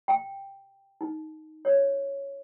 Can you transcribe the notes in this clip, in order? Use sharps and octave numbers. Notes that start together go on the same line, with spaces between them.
G5
D#4
C#5